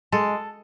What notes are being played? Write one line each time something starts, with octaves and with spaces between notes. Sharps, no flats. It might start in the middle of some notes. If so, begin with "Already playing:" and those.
G#3 A4